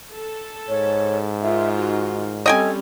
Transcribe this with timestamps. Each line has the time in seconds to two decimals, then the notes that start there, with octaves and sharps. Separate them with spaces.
0.13 A4
0.68 G#2 C#5
1.42 D#3 F4 E5
1.77 F#4
2.46 G3 C4 C#4 A4 D#5 G5 G#5